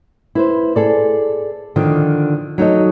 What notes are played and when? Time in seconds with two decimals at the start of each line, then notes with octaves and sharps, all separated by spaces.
0.35 E4 B4 C5
0.76 G#4 A4 D5
1.76 D3 D#3 F3
2.58 F#3 D#4 A4 D#5